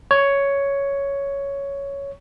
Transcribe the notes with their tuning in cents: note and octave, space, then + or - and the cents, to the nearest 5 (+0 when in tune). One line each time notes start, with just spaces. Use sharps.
C#5 +5